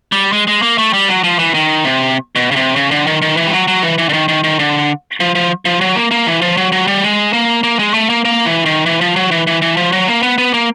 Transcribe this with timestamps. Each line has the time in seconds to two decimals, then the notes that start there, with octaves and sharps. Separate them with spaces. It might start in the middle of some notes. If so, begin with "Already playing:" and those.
0.12 G3
0.32 G#3
0.47 G#3
0.62 A#3
0.78 A3
0.93 G3
1.08 F#3
1.24 F3
1.39 E3
1.54 D#3
1.84 C3
2.36 B2
2.51 C#3
2.56 C3
2.76 C#3
2.91 D3
3.07 D#3
3.22 D#3
3.37 E3
3.47 G3
3.53 F#3
3.68 F#3
3.83 E3
3.98 E3
4.09 D3
4.13 D#3
4.28 D#3
4.44 D#3
4.59 D3
5.20 F3
5.35 F3
5.65 F3
5.81 F#3
5.96 A#3
6.11 A#3
6.27 E3
6.42 F3
6.57 F#3
6.72 F#3
6.87 G3
7.03 G#3
7.33 A#3
7.63 A#3
7.79 G#3
7.94 A3
8.10 A#3
8.25 A#3
8.45 E3
8.66 D#3
8.86 E3
9.01 F3
9.16 F#3
9.31 E3
9.47 E3
9.62 E3
9.77 F3
9.92 F#3
10.08 A#3
10.23 B3
10.38 B3
10.54 A#3